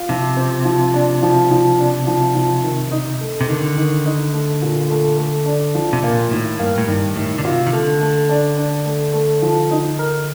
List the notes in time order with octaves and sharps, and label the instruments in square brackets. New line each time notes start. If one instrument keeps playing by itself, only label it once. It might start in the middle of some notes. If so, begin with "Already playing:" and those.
Already playing: [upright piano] F4
[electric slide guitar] C3 [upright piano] F3
[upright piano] C4
F3
D4
F3
F3
D4
F3
F3
D#3
D#4
A3
[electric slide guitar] C3
[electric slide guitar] D3 [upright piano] D#3
[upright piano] D#3
D#4
A3
A#2
A3
A3
D4
F3
[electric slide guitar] C3
[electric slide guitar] A#2 [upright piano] A#3
[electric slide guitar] A2 [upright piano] D#3
[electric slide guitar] G2 [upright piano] A#3
[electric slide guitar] A2
[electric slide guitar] G2 [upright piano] D#3
[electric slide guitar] A2 [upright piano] D#3
[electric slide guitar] D3
[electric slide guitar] C3 [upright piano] F4
[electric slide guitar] D#3
[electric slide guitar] D3 [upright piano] A3
[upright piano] A3
D4
D4
A3
A3
F3
D#4
A#4